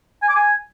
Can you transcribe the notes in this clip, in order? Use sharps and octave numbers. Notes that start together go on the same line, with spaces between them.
G#5
D6
G#5